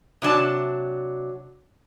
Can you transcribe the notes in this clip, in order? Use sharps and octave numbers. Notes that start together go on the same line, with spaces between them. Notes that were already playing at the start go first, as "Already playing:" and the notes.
C3 F#3 D4 A5